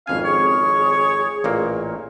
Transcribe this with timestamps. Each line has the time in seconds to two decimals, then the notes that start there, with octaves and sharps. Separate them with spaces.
0.07 G#1 F2 C#4 F5 G#5
0.24 G#4 C#5
1.44 A1 A#2 A#3